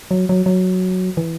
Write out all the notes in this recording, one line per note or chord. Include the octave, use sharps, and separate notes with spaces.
F#3
F#3
F#3
E3